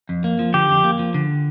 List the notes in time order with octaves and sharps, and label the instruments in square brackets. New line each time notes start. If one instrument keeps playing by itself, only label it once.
[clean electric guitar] F2
A#3
F3
[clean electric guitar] D3 [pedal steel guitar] G4
[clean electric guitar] F2
A#3
F3
D3